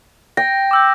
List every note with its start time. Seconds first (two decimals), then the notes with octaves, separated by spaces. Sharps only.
0.37 G5 A#6
0.71 D6 E6 G6